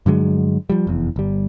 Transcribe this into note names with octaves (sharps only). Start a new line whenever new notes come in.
G2 D3 F#3 G#3
F3 G3
F1 E2
G1 G3